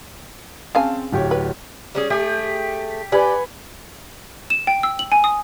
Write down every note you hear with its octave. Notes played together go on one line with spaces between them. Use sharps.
C#3 C4 F5 G#5 A5
D1 G4 C#5
B4
G3 C#4 G#4
A3 G4 G#4
G4 B4 D5 F#5 G#5
E7
G5
E6
F#7
G#5
D#6